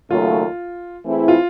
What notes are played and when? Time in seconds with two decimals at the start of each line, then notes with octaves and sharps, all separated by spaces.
0.10 D#2 C#3 F#3 A3 F4
1.04 E3 A3 C4 E4 G#4
1.28 F4